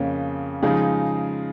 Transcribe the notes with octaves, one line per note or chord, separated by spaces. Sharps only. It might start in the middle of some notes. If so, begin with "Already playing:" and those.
Already playing: F2 C#3 A#3 C#4
C#3 F3 G#3 D#4 G#4